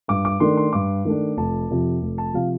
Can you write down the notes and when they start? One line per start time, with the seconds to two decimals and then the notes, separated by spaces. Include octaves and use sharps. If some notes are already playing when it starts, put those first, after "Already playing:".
0.08 G2 D6
0.25 D6
0.40 D#3 A3 D4 C6
0.57 C6
0.73 G2 D6
1.05 D#3 A3 D4
1.37 F1 A5
1.70 F2 C3 F3
2.02 F1
2.18 A5
2.34 C3 F3 F5